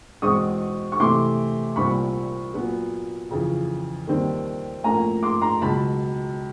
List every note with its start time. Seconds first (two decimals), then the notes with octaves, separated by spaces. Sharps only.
0.22 E2 B2 G#3 C4 C#6 D#6
0.92 C#6
0.99 C3 E3 A3 C6 D6
1.76 C2 A#2 G3 C4 B5 C#6
2.54 A#2 F#3 B3
3.31 F2 C#3 E3
4.07 D#2 D#3 G3 C4
4.84 A2 F3 A#3 C#4 G#5 A#5
5.23 C6 D6
5.42 A#5 C6
5.61 C#2 B2 F#3 A5 B5